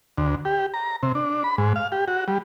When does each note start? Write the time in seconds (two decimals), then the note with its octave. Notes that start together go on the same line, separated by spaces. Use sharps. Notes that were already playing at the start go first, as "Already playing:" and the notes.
0.18 D2
0.45 G4
0.74 A#5
1.03 C3
1.15 D4
1.44 B5
1.58 G#2
1.76 F5
1.92 G4
2.08 F#4
2.28 G3